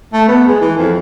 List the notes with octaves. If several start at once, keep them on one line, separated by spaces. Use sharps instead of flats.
A3
B3
G#3
E3
F2